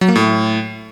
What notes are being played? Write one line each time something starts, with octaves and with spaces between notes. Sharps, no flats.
F#3
A#3
A2